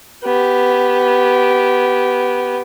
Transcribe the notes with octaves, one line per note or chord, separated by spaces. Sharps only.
B3 G4